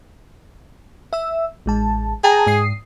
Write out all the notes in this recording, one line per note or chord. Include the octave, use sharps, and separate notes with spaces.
E5 E6
A1 G#3 A5
G#4 G5 A5 A#5
G#2 D#6 C7